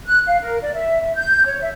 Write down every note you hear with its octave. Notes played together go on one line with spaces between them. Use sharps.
F#6
F5
A#4
D5
E5
E5
G6
C#5
E5